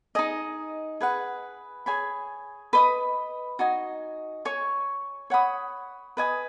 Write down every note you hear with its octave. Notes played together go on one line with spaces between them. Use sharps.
D#4 G#4 D#5
G#4 B4 F#5
G#4 C#5 G#5 B5
B4 D#5 B5 D#6
D#4 F#4 D#5 G#5
C#5 G#5 C#6
C#5 F#5 B5 D#6
B4 D#5 G#5 D#6